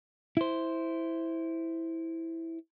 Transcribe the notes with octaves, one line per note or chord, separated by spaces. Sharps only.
E4 C5